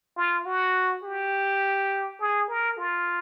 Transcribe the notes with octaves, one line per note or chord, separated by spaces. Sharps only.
F4
F#4
G4
G#4
A#4
F4